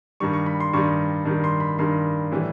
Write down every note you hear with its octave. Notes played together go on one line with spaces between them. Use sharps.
G2 D#3 G3 C#6
C#6
B5
C6
G2 D#3 G3 C#6
G2 D#3 G3
C6
B5
G2 D#3 G3 C6
A2 E3 G3